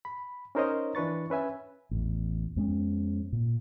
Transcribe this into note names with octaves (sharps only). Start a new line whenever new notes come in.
B5
C#4 D#4 A#4 C5 C#5 D#5
E3 D4 B4 C#6 A6
C#4 B4 E5 G#5
A1 E2
F2 G#3 B3 C#4
A#2